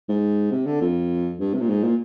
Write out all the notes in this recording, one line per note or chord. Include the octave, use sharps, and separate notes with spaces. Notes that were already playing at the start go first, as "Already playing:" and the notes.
G#2
C3
D3
F2
G2
C3
A#2
G#2
A#2